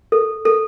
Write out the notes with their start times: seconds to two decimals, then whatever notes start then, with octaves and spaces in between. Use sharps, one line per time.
0.12 A4
0.45 A4